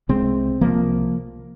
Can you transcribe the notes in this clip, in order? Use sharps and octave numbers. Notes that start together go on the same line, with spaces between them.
C2 C3 G#3 C4
C2 C3 F3 A#3